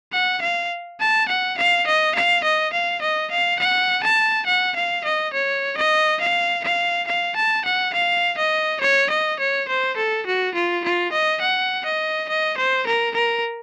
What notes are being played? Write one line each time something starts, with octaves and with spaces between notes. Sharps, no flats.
F#5
F5
A5
F#5
F5
D#5
F5
D#5
F5
D#5
F5
F#5
A5
F#5
F5
D#5
C#5
D#5
F5
F5
F5
A5
F#5
F5
D#5
C#5
D#5
C#5
C5
A4
F#4
F4
F4
D#5
F#5
D#5
D#5
C5
A#4
A#4